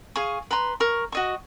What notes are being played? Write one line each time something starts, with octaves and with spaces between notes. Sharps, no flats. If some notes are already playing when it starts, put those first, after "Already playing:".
G#4 F5 G#5 C#6
B4 A#5 C6
A#4 C#6
F#4 D#5 C#6